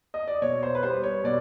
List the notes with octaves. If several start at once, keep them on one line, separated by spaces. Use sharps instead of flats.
D#5
D5
B2 C#5
C5
B4
G3 B3 C5
C#5
B2 D5